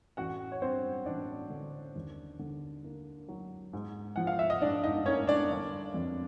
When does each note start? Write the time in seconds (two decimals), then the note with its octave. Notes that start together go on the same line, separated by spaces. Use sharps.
0.17 A1 F#4 F#5
0.52 C#5
0.62 G2 C4 C5
1.06 A1 D4 D5
1.50 D3
1.96 D#2
2.39 D3
2.84 A#3
3.28 F#3
3.73 G#2
4.16 F3 F#5
4.27 F5
4.39 E5
4.50 D#5
4.62 G#2 D4 D5
4.84 D#4 D#5
5.06 A#3 C#4 C#5
5.27 D4 D5
5.51 G1
5.94 F2